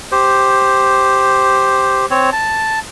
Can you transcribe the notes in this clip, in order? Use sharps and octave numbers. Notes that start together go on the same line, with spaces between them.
G4 C5
C4 C#5
A5